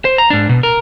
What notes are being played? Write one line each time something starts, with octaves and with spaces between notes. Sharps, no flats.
C5
A#5
G#2 D4
B2
A#4